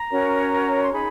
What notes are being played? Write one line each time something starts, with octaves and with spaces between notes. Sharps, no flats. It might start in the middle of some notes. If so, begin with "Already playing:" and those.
Already playing: A#5
C#4 F#4 A#4 C#5
C6
D#4 G#4 B5